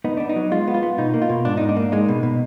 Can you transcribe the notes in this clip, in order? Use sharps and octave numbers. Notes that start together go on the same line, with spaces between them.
B3 D#4
B3 D4
D#4
F#3
G#3 F4
B3
F4
B3
B2 D#4
A#3
F4
B2
G#2 D4
G#2 D#4
D4
A#3
G#3 D#4
B2
B2